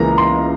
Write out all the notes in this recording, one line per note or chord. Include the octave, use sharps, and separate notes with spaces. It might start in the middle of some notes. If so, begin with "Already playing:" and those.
Already playing: C#2 C#3 E3 A#3 C#4 A#5
C6